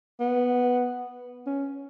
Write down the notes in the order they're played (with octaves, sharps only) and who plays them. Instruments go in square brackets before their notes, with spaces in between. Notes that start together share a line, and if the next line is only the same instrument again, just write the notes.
[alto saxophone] B3
C#4